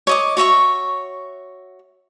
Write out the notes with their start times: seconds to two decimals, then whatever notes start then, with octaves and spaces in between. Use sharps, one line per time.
0.07 C#5 D#5 D6
0.37 F#4 C#5 E5 C#6